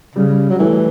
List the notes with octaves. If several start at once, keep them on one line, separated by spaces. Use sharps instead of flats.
C#3 G3
F#3
E3 A3